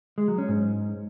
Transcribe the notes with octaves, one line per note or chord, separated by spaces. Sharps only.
G#3
F#3
C#4
G#2